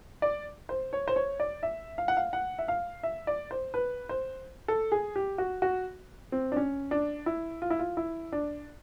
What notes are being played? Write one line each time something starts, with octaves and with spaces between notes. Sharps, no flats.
D5
C5
C#5
C5
C#5
D5
E5
F5
F#5
F5
F#5
E5
F5
E5
D5
C5
B4
C5
A4
G#4
G4
F#4
F#4
C4
D4
C#4
D4
E4
F4
E4
F4
E4
D4